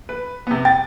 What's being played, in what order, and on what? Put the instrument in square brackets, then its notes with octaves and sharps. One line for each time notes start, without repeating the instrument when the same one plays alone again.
[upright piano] B4
C3 B3
[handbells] G5 [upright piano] A6